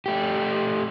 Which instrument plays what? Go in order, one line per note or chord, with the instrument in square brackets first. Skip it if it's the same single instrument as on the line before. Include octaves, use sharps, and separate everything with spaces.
[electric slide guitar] A3 G4